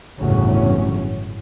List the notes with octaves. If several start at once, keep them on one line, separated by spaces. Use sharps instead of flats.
G1 E2 A2 C#3 F#3 C#4